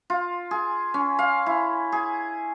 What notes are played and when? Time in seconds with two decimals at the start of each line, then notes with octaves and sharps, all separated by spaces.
0.10 F4
0.51 G#4
0.94 C#4
1.19 F5
1.46 E4
1.92 G#4